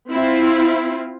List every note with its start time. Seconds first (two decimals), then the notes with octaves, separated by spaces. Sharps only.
0.12 C4 E4 F4